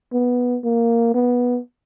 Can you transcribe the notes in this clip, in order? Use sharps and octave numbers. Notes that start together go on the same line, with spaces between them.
B3
A#3
B3